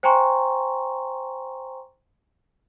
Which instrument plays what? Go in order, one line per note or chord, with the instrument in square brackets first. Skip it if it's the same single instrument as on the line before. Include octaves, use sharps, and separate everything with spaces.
[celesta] C5 G5 G#5 A#5 C6 C#6